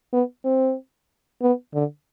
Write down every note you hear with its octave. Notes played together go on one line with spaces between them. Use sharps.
B3
C4
B3
D3